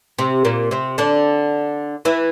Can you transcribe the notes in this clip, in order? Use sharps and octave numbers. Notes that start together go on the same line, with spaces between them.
C3 C4
A#2 A#3
C3 C4
D3 D4
E3 E4